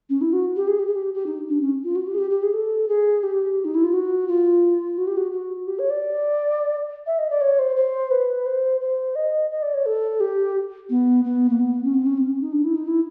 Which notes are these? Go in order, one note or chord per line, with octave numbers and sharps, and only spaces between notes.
C#4
E4
F#4
G4
G#4
G4
G#4
G4
G4
D#4
D4
C#4
F4
F#4
G4
G#4
G4
G4
G#4
A4
G#4
G4
D#4
E4
F4
F#4
F4
F#4
G4
F#4
F#4
G4
C#5
D5
E5
D#5
D5
C#5
C5
C5
B4
C5
C5
D#5
D#5
D5
C#5
A4
G4
B3
B3
A#3
B3
C#4
C4
C#4
C4
C#4
D#4
D4
E4
D#4
E4